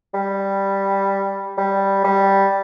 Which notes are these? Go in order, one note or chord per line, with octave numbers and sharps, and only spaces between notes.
G3
G3
G3